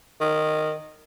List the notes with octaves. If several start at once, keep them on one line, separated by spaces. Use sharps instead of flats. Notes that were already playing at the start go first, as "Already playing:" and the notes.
D#3